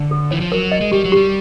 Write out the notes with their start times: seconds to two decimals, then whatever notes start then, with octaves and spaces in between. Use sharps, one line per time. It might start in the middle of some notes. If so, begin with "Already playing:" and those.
Already playing: D3
0.11 A4
0.31 E3 C#5
0.41 F3
0.51 F#3 A#4
0.72 D#5
0.81 G#3
0.92 G3 G4
1.05 F#3
1.12 G3 G4